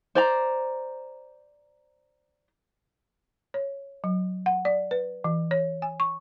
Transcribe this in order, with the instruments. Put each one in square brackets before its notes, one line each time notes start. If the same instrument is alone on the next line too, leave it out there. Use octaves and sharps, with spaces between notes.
[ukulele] C5 D5 A#5
[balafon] C#5
F#3
F#5
D5
B4
E3
C#5
G#5
C#6